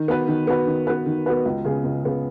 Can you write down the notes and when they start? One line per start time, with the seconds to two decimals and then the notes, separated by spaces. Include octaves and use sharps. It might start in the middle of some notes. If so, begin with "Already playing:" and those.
Already playing: D#3
0.08 B3 F#4 B4
0.28 D#3
0.47 B3 F#4 B4
0.67 D#3
0.87 B3 F#4 B4
1.06 D#3
1.26 B3 F#4 B4
1.46 C#2
1.65 C#3 B3 G#4
1.84 C#2
2.04 C#3 B3 G#4